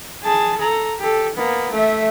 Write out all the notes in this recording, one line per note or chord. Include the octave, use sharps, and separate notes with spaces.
G#4 A5
A4 A#5
G4 A4
A#3 B3
A3 E5